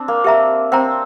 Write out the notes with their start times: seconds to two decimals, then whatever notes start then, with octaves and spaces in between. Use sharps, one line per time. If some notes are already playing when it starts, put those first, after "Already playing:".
Already playing: C4 D4
0.08 A#3
0.24 G4 A#4 E5 A#5
0.72 C4 C5 G5 A#5